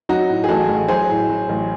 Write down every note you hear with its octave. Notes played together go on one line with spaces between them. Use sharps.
F#3 D#4 F#4
A2
G#4
A1 F#4 A4
A1
F#3 G#4 C5
A2
F#3
A1